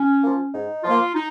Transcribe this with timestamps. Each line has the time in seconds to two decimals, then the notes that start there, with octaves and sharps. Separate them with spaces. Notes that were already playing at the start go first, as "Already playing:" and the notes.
Already playing: C#4
0.22 F3 A#3
0.52 G#2 D#4
0.83 F3 A#3 F4
1.14 D#4